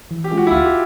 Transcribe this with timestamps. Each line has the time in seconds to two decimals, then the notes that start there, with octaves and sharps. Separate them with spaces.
0.11 E3
0.24 G4
0.31 G#3 C#4 F4 G#4
0.38 F#4
0.47 E4
0.52 D2 F4
0.65 G4